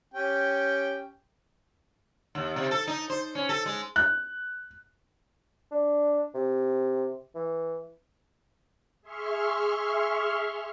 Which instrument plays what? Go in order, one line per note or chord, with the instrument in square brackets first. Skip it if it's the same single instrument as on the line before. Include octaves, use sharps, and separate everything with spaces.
[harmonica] C#4 G4 G5
[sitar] D#2
C3
A4
D#4
C5
C#4
A4
G#3
[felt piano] F#6
[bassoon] D4
C3
E3
[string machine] G#4 E5 C6 C#6 F6